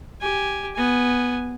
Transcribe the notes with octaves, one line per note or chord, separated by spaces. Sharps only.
G4 G#5
B3 G#5